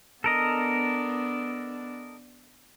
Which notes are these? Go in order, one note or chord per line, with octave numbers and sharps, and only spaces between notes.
B3 D4 A4 A#4 D#5